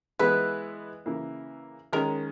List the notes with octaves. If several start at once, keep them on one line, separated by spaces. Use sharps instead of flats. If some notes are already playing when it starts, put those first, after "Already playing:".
E3 G#3 B3 E4 B4
C#3 E3 A#3 E4
D#3 G#3 C#4 A#4